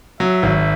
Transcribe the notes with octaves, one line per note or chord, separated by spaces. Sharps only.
F#3 E5
G#1